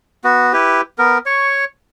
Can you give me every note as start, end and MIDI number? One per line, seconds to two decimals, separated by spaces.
0.24 0.53 59
0.24 0.53 66
0.53 0.81 64
0.53 0.81 67
0.53 0.81 71
0.98 1.18 59
0.98 1.18 70
1.26 1.65 73
1.26 1.65 85